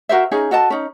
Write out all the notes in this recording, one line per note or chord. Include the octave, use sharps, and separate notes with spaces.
F#4 A#4 C5 E5
C#4 D#4 G#4
F#4 A4 D#5 A5
C#4 D#4